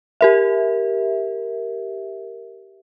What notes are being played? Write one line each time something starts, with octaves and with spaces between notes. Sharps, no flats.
G4 A#4 E5